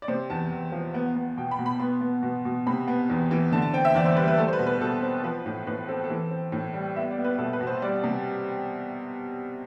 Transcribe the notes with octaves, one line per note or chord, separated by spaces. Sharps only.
D5
C3 C5
E2 A5
E2
F3
B3
B3
B2 G5
B5
B2
B5
B3 C6
B3
B2
B2
C3 B5
B3
E2
E3
D3 A5
A5
C4 G5
E5
E2 D5
C5
G3 B4
B4
A3 A4
C5
B4
B2
B4
B2 A4
C4
F3 B4
A2
A2 B4
C4 A4
A4
E3
C4
A2
G3
B3 E5
D5
B3
B4
B2 A4
B4
B2
C5
G3 D5
C3